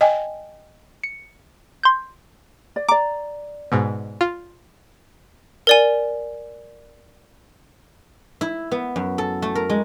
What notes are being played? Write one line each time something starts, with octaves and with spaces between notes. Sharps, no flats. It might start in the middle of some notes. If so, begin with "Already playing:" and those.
D#5 G5 G#5
C#7
C6 G6
D5
D5 A#5 D6
G#2 B2
F4
A#4 D5 G#5
E4
B3
F#2
A4
A3
A#4
G#3